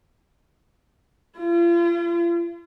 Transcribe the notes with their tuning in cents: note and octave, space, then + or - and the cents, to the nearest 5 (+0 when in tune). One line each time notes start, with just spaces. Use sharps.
F4 -40